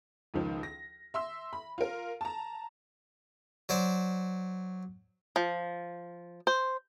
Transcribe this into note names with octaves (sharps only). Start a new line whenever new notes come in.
C#2 D#3 F3
A#6
E5 C6 E6
B5
F4 A#4
A5 A#5
F#3 C5 D5
F3
C5